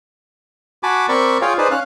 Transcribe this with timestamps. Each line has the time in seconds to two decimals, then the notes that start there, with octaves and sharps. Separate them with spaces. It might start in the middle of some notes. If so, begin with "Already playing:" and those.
0.83 F#4 G#5 A5 B5 D6
1.09 C4 A#4 D5 B5 C#6
1.42 F4 G#4 C#5 F5 G5
1.58 D#4 G#4 B4 C5 D5
1.71 C#4 F5 F#6